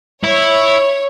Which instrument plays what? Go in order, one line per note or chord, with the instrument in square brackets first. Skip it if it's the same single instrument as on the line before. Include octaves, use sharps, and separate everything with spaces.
[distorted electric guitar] E4 [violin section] C#5